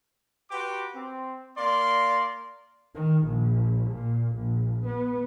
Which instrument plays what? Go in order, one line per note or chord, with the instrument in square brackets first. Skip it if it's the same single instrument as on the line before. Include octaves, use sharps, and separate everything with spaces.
[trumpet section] F#4 G4 B4 C6 D6
C4
A#3 D5 F5 C6
[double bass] D#3
A#1
A#2
A#1
B3